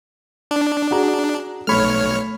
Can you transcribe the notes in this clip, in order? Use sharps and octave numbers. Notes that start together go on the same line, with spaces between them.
D4
F#4 G#4 A#5
B1 A3 C#5 B5 F6